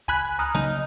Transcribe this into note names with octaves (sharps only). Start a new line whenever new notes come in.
C#2 G#5 B5 F#6
A#5 D#6 F6
C#3 F#3 A#3 D#4